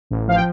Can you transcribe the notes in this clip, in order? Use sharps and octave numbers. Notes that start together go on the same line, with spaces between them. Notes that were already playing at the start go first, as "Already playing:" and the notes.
A1
F3 F5
G5